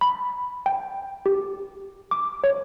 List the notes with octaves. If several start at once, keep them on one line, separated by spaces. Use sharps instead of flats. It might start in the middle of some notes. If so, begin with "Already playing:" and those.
B5
G5
G4
D6
C#5